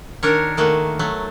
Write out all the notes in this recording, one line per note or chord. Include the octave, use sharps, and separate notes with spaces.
D#3 D4 A#4 C#5
D#3 A3 A#3 F#4
F#3 A3